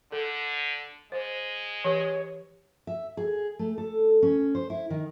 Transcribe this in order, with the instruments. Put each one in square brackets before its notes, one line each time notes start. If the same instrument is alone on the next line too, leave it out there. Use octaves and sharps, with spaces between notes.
[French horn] D3 [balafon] A4
[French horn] G#3 [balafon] C5
[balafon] E3 G4 B4 [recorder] C#5
[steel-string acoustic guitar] E5
G#4
A3
A4
C#4
C5
E4
D#3